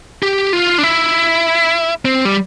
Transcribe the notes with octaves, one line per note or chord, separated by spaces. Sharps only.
G4
F4
D4
E4
C4
G3